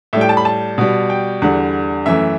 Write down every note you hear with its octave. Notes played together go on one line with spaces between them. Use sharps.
A2 G3 E5
G5
A5
B5
A5
B2 G3
G5
E2 D3 G3 F#5
F#2 E3 A3 E5